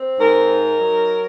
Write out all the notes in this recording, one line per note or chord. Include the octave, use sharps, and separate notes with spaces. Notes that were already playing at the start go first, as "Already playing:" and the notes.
Already playing: C4
G#2 A#4
D#4
F#3